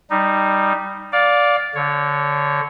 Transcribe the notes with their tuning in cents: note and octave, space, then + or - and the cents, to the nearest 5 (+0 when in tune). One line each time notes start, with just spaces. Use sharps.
G3 +0 D#4 -10
D5 -10 F5 +20
D3 -15 C#5 +0